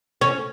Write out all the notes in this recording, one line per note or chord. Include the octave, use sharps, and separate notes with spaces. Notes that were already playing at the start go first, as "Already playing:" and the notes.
C#4